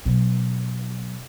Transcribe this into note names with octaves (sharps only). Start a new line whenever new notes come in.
B2 F#3